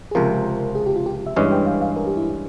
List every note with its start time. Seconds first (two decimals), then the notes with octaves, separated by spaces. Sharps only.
0.11 G#4
0.15 C#2 C3 F3 A#4
0.75 G#4
0.86 G4
0.96 F4
1.06 G4
1.26 E5
1.36 G2 E3 G#3 C#4 F5
1.52 G5
1.66 F5
1.81 F5
1.96 A#4
2.07 G4
2.17 E4